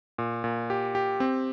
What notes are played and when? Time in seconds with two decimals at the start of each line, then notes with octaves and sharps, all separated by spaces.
0.18 A#2
0.44 A#2
0.70 G4
0.95 G4
1.20 C4